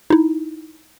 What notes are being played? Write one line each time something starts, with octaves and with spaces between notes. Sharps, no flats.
D#4 E4